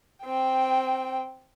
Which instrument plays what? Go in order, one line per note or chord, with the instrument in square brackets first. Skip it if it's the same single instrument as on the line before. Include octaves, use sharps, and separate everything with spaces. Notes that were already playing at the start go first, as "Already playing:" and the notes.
[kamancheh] C4 G5